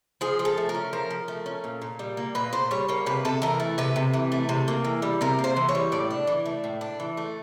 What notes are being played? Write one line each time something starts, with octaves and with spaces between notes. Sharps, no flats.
F3 G#4
F3
A4
A3
A#4
C#4
F3 A#4
F3
A3
C#4
A#2
A#2
G3
A#3
A#2 B4
A#2 C5
G3 C#5
A#3 C#5
C3 B4
C3 A4
E3 A#4
A3
C3 B4
C3
E3
A3
C3
A#3
E3
G3
C3 A#4
A#3
C5
E3
C#5
G3
A2 D5
D4
E3
A3
A2
D4
E3
A3